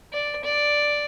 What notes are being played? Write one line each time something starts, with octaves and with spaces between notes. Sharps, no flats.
D5
D5